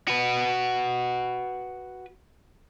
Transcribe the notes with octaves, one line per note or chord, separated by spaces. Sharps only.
F#4 B4